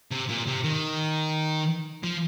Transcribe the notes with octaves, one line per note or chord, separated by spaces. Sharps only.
C3
A#2
C3
D#3
F3